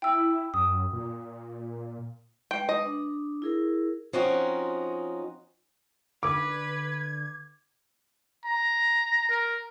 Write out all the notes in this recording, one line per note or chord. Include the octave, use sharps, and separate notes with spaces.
E4 G5 E6
F#2 D#6
A#2
G#3 B4 G5
D#5
D4
E4 G#4 A#4
F3 C4 C#4 D#4 F#4
D3 B4 D6 G#6
A#5
A#4